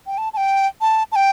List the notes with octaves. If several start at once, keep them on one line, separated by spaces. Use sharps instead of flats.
G5
A5
A5
G5
A5
A5
G5